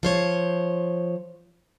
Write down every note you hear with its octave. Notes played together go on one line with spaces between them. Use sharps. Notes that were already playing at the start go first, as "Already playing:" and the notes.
F3 C5 C#5